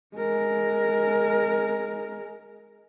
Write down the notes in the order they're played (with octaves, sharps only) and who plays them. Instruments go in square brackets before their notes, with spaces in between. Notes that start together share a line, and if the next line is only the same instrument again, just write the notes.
[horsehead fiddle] G#3 A#4